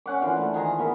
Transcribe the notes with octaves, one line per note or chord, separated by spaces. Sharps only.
C#4 F#5 D6
D3 E3 F4 C5
A3
D#3 G#4 A#5
B3 A#4 E5